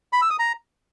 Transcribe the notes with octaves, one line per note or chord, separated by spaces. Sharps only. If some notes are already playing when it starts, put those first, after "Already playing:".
B5
E6
D#6
A#5